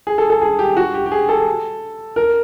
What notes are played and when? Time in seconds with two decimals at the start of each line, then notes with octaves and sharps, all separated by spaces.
0.07 G#4
0.18 A4
0.30 A4
0.42 G#4
0.59 G4
0.77 F#4
0.94 G4
1.06 G4
1.12 G#4
1.29 A4
2.16 A#4